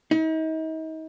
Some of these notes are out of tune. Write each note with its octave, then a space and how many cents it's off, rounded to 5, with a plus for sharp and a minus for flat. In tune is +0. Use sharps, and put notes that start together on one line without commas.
D#4 +40